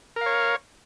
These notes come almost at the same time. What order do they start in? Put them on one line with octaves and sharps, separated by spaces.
A#4 F5 C#5